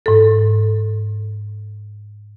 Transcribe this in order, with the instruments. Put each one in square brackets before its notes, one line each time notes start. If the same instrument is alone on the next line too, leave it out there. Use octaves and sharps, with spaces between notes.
[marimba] G#2 A4